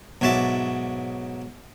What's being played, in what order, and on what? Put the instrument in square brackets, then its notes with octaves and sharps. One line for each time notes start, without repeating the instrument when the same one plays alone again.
[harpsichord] B1 G#2 F#4 E5 A5 D6